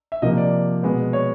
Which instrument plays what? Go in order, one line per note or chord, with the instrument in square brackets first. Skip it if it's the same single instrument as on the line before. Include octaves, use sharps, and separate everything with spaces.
[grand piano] E5
C3 F3 A#3 D#5
D5
B2 G#3 B3
C#5